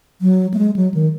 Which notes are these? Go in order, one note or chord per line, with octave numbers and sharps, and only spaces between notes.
F#3
A3
G#3
F#3
D#3